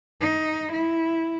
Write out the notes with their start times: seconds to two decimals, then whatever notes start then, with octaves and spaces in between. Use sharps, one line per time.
0.21 D#4
0.72 E4